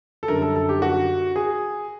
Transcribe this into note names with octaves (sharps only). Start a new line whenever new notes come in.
A4
F#2 D3 G3 A#4
A4
A4
G4
F#4
G#4